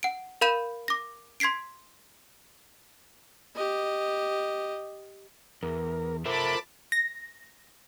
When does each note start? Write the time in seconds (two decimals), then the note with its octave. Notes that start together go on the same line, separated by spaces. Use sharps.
0.03 F#5 D7
0.41 A#4 F5 B5 G6 D#7 E7
0.88 D6 A#6
1.40 C6 G#6 B6 C7 D7
3.55 G4 D#5
5.63 E2 A#4
6.26 F4 A4 A#4 C5 E5 A5 B5 D6
6.92 A#6